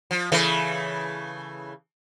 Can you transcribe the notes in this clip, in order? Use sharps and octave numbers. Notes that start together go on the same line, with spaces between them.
F3
C#3 E3 A3